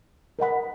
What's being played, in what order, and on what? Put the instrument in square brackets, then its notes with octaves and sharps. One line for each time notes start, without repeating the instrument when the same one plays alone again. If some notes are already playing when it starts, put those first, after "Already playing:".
[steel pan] A#4 D#5 F#5 B5